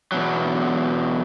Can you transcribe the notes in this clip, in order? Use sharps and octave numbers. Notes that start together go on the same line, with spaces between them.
E2 B2 F#3